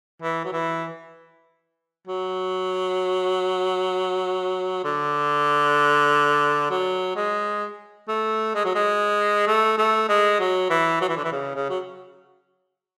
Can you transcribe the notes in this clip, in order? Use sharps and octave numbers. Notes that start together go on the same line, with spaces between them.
E3
F#3
E3
F#3
D3
F#3
G#3
A3
G#3
F#3
G#3
A3
A3
G#3
F#3
E3
F#3
E3
D3
E3
C#3
C#3
F#3